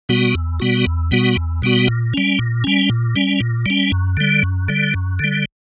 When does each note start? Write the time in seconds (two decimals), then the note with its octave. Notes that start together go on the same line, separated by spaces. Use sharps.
0.09 B2 G3 B3 F#4
0.34 E2
0.60 B2 G3 B3 F#4
0.86 E2
1.11 B2 G3 B3 F#4
1.36 E2
1.62 B2 G3 B3 F#4
1.88 A#2
2.14 G3 C#4
2.39 A#2
2.64 G3 C#4
2.90 A#2
3.16 G3 C#4
3.40 A#2
3.66 G3 C#4
3.92 F#2
4.17 D3 G3
4.43 F#2
4.69 D3 G3
4.94 F#2
5.19 D3 G3